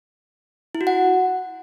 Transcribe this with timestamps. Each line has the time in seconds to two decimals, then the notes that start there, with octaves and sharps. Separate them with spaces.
0.75 E4
0.81 F#4
0.87 F#5